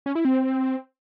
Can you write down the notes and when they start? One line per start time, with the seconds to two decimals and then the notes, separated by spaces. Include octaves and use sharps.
0.06 C#4
0.15 E4
0.25 C4